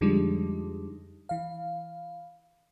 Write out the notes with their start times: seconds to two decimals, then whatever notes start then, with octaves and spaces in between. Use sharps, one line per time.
0.01 F2 D3 F3 G3 G#3 D#4
1.29 E3 F5